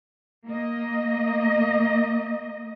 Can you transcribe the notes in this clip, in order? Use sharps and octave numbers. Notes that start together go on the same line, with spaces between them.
A#3 D#5